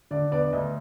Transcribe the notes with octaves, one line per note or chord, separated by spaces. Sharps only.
D3 D5
B3 D5
D5
D2 D#5